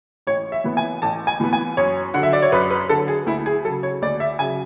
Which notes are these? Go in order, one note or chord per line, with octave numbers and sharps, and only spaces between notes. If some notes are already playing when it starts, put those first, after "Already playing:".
A1 C#5
E5
A2 E3 B3
G#5
A1 A5
G#5
A2 E3 B3
G#5
F#2 C#5
D3 F#3 F#5
E5
D5
C#5
F#2 B4
B4
D3 F#3 A4
G#4
D2 E4
G#4
C#3 F#3 A4
C#5
D2 D5
E5
C#3 F#3 G#5